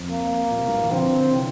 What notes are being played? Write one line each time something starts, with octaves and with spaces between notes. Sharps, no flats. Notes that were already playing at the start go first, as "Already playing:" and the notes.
Already playing: F2
A#3
A#2
C3
G2 A#2
E3
D3 F3 C4
C3 E3